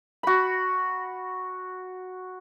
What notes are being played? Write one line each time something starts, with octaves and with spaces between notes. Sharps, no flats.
F#4 B5